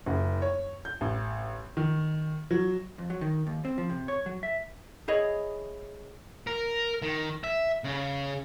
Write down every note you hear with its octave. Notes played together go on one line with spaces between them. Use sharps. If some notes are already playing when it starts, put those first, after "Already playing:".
F#1
C#5
G6
A1
D#3
F#3
F2
F#3
D#3
D#2
C4
F3
C3
C#5
F#3
E5
E4 G#4 C#5 D#5
A#4
D#3
E5
C#3